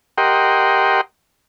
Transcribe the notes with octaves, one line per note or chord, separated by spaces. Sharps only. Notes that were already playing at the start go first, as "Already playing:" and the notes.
G4 A#4 D#5 F#5 G5 C6